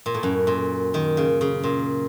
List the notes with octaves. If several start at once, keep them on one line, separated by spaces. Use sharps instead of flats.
A#2
A2
F#2
A#2
D#3
C#3
C#3
A#2